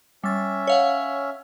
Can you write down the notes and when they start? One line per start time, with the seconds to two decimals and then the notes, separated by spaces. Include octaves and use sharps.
0.24 G3 C#4 E5 A6
0.67 C#5 F5 F#5